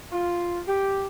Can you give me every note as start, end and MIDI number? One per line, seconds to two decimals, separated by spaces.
0.12 0.61 65
0.67 1.06 67